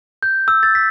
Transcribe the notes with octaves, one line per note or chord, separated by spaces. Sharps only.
G6
E6
A6
B6